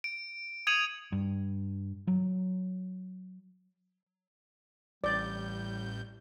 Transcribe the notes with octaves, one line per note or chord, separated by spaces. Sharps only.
D7
D#6 G#6 C#7 D#7 F7 F#7
G2
F#3
A1 G3 D5 G6